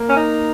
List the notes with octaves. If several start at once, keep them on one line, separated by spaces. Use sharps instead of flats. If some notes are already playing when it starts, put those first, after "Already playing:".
Already playing: A#3
C#4
D#4